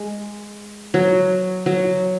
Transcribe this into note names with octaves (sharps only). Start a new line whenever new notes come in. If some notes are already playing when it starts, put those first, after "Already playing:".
Already playing: G#3
F#3
F#3